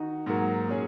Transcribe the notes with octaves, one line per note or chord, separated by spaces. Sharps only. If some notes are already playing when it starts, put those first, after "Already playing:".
Already playing: D#3 D#4 F#4
G#2 F#3 A#3 F#4 A#4
A#2 F#3 C#4 G#4